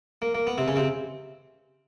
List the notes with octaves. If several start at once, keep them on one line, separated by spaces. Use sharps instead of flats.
A#3
A#3
B3
C3 C4
C#3 C#4
C3 C4